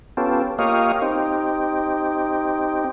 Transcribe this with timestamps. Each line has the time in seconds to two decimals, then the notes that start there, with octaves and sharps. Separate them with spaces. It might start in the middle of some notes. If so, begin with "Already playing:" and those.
0.17 B3 C#4 F4 G4 A4
0.59 A#3 F4 G4 C#5 D#5 F5
1.02 C4 D#4 G4